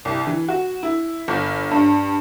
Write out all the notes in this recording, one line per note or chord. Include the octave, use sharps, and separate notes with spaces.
C2
E3
F#4
E4
G1
G2